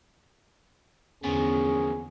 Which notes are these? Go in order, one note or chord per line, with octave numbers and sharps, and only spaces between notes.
E2 B2 D3 F3 C#4 G#4